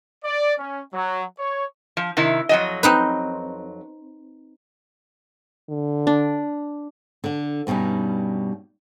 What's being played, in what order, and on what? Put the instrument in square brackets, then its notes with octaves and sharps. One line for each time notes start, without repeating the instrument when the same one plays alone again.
[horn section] D5
C#4
F#3
C#5
[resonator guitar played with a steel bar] F3
C3 D#3 E4
F2 F#3 D#5
[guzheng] C4 D#4 B4
[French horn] D3
[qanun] D4
[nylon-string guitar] D3 D4
G2 B2 G3 C#4 D#4